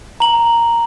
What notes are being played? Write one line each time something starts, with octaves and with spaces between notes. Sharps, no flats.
A#5 F#7